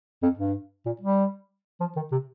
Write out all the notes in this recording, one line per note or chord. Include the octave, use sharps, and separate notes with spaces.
F2
G2
A#2
G3
F3
D#3
C3